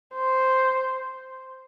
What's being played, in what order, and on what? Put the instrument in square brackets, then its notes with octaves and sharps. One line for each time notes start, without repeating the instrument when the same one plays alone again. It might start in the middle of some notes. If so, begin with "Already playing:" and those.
[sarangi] C5